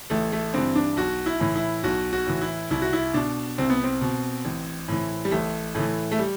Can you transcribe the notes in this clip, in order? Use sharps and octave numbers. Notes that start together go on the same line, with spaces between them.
A1 A3
A3
G2 E3 C4
D4
B1 F#4
E4
A2 E3
E4
B1 F#4
F#4
A2 E3
E4
C2 E4
F#4
E4
B2 D4
C2 C4
B3
C4
B2
A1
A2 E3
G3
A1 A3
A2 E3 A3
A3
G3